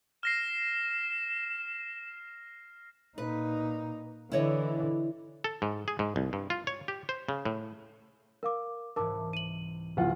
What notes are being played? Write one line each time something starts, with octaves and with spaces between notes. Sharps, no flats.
F6 A#6 C7 E7
A#2 D#4 B4
D3 E3 E4 C#5 D#5
A4
G#2
G#4
G#2
C2
G2
F4
C#5
G4
C5
C#3
A2
A#4 F5 D6
C2 G#2 E3 A#4 A5 D6
D#7 F#7
D1 F4 F#5